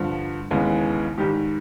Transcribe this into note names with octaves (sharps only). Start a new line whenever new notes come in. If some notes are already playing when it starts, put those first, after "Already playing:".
Already playing: G2 D3 F3
D#2 C#3 E3 G#3 B3
G#2 D#3 G3 G4